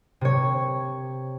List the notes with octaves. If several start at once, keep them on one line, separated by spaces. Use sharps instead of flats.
C3 C#5